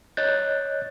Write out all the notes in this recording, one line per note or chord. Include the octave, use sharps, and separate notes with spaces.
C#5 D#5 F#6 G6 A6